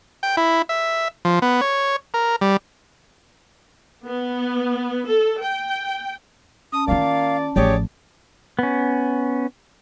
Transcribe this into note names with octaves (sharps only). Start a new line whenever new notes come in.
G5
E4
E5
F3
B3
C#5
A#4
G3
B3
A4
G5
C#4 A5 D#6
D#3 A#3 F4 D5 F5
A1 F3 G4 G#4 C#5 D5
B3 C#4